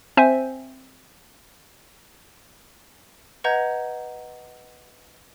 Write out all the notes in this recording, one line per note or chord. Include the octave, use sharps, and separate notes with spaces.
C4 C5 E5 G#5
B4 D#5 F#5 A#5 G6 G#6